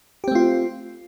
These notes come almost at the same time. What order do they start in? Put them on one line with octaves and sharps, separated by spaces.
G4 C4 A3 F4